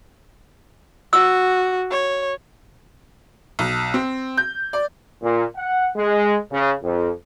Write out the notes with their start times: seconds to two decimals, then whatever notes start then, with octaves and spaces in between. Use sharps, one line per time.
1.13 F#4 E6
1.91 C#5
3.59 B1
3.94 C4
4.37 G6
4.73 D5
5.22 A#2
5.57 F#5
5.96 G#3
6.52 C#3
6.83 F2